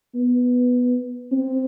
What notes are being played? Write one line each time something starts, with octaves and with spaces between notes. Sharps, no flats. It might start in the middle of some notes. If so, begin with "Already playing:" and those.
B3
C4